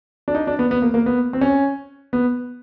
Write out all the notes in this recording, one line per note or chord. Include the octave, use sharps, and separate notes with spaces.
D4
D#4
D4
B3
B3
A#3
A#3
B3
C4
C#4
B3